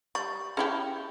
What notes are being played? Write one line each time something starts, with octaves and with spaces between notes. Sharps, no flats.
G3 C#6 A6
C#4 E4 G4 G#4